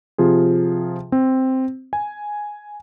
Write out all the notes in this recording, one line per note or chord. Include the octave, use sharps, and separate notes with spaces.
C3 F3 F4 G#4
C4
G#5